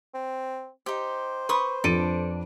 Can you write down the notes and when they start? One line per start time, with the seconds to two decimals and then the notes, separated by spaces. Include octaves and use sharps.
0.14 C4
0.86 D#4 G4 C5
1.49 B4 C6 C#6 D#6
1.84 F2 D4 A4 D7 D#7